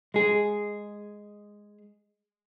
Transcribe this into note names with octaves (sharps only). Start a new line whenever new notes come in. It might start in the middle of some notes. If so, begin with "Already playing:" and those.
G#3 G#4